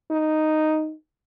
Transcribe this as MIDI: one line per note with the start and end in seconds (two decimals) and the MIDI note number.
0.11 0.93 63